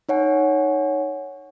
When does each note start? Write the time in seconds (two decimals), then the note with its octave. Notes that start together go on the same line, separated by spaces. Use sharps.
0.09 D#4 C#5 F#5 G#5